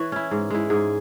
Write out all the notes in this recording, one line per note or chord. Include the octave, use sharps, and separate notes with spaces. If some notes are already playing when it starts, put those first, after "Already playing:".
Already playing: E3 B4 C#5
C#4 E4
G#2
G#3 E4
G#2 G#4